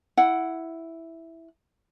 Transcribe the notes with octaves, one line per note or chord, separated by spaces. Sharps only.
E4 F#5